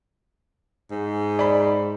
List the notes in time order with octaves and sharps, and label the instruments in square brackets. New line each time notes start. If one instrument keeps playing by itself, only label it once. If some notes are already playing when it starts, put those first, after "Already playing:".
[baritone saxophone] G#2
[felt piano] D5 B5